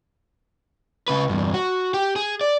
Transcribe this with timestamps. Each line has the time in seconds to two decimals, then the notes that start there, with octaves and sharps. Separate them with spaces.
1.08 C#3 B4
1.29 E2 G2
1.54 F#4
1.94 G4
2.16 G#4
2.41 D5